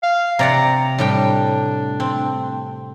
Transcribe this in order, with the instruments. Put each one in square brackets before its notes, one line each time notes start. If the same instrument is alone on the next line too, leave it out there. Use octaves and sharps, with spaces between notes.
[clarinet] F5
[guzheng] C3 D5 F#5 [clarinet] A#5
[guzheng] A2 G3 G5 [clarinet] D4
[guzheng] C4